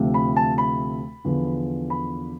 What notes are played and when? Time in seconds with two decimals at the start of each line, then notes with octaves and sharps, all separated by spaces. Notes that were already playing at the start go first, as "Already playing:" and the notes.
Already playing: D2 C3 F3 A3
0.14 B5
0.36 A5
0.58 B5
1.25 E2 D3 F3
1.90 B5